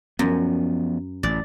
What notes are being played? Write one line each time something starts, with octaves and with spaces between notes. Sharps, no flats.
F#2 F3 B3
A1 D5